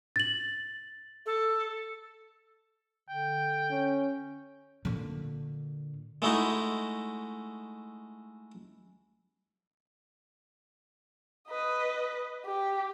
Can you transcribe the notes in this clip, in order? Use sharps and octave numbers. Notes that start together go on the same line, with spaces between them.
A6 F#7
A4
D3 G5
C#4
A#2 D3
G#3 A3 D#4 E4 F#4
B4 D#5
G4